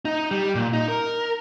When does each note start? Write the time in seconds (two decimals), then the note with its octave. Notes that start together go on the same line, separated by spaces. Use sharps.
0.05 D#4
0.31 G3
0.55 A#2
0.73 D#4
0.88 A#4